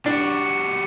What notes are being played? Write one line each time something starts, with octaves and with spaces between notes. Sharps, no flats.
G3 D4 F#4